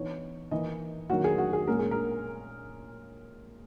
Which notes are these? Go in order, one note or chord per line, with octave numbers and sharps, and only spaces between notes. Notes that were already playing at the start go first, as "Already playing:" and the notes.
Already playing: E3 B3 D#4 C#5
E3 A#3 D#4 D#5
D#3 F#3 A#3 F#4
G#4
F#4
G#4
A#2 G#3 C#4 A#4
G#4
A#4